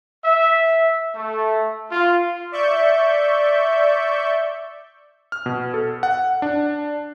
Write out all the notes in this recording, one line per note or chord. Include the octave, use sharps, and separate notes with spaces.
E5
A3
F4
D5 E5 C#6 G6
F6
B2
A4
F#5
D4